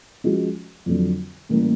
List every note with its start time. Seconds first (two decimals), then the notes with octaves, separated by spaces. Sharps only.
0.24 F3 G#3 C#4 F#4
0.86 F2 D3 F#3
1.49 A2 E3 G3 A#3 C#4